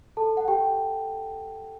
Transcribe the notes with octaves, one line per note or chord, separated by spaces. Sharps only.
A4 A5
F#5
G4 G5